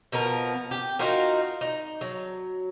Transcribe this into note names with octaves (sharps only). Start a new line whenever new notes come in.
B2 F3 B3 A#4
G4
D#4 F4 F#4 A#4
D#4
F#3